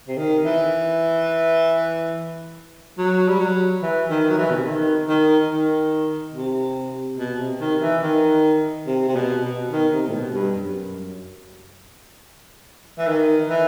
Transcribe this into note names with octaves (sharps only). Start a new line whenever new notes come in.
C3
D#3
E3
F#3
G3
F#3
E3
D#3
F#3
E3
B2
C3
D#3
D#3
D#3
C3
B2
C3
D#3
E3
D#3
C3
C3
B2
B2
D#3
C3
A2
B2
G2
F#2
E3
D#3
E3